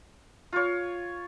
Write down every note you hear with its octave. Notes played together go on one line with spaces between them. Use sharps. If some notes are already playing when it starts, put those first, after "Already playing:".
F4 C#5